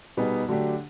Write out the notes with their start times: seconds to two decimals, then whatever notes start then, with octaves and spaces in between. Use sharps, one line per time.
0.17 B2 G3 B3 D#4 G#4
0.48 D3 F#3 A3 D4 G4